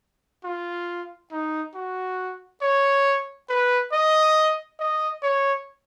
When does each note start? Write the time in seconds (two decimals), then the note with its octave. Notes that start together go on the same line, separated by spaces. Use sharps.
0.44 F4
1.32 D#4
1.75 F#4
2.62 C#5
3.49 B4
3.92 D#5
4.79 D#5
5.23 C#5